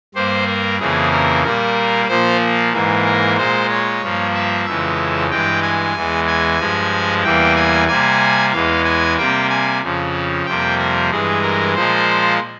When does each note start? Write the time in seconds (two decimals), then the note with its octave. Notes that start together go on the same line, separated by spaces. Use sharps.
0.14 G2 G3 A#3 C5
0.47 A#4
0.79 F2 C#3 E3 A#3 G#4
1.11 A#4
1.43 A#2 G3 A#3 A#4
2.08 A#2 F3 A#3 C5
2.72 G#2 E3 A#3
3.05 A#4
3.37 A#2 G#3 C5
3.69 C#5
4.01 G2 F3 A#3
4.34 E5
4.65 F2 C#3 E3 G#3 E5
5.30 G2 E3 G#3 G5
5.62 G#5
5.94 E2 E3 G#3
6.27 G#5
6.59 G2 F3 G#3
7.24 E2 E3 G3 A#3 G5
7.56 G#5
7.88 C3 G3 A#3 G#5
8.52 E2 E3 G#3 F5
8.85 G#5
9.17 C3 G3 A#3 G5
9.49 G#5
9.81 F2 C#3 F3
10.45 F2 C3 G3 A#3 G5
10.79 A#4
11.11 G2 E3 G#3 G#4
11.42 A#4
11.75 A#2 F3 G#3 C5